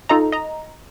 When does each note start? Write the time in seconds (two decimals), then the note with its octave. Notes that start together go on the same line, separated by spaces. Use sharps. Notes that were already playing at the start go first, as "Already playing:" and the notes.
0.09 D#4 F4 A4 D#5 A#5
0.32 D#5 A#5